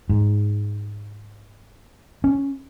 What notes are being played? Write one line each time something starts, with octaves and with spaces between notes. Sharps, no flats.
G#2
C#4